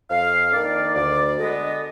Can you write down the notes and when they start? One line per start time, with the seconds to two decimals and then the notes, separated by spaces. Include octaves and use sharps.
0.10 F2 F5
0.52 D#3 A#3 D4 D5
0.95 D2 D5
1.38 D3 G#3 B3 D#5